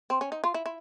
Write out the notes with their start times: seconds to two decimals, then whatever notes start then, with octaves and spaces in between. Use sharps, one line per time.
0.10 C4
0.21 C#4
0.32 D#4
0.44 F4
0.54 E4
0.66 E4